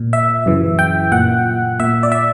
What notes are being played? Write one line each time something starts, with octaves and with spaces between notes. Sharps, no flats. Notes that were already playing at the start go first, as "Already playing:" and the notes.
Already playing: A#2
E5
F#2 C#3 E3
G5
A#2 F#5
A#2 E5
D5
E5